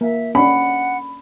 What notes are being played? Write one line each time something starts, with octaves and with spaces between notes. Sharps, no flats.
A#3 E5
C#4 D4 F#5 B5